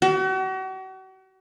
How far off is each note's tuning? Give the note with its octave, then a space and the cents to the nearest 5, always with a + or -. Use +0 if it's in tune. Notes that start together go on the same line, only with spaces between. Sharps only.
F#4 +40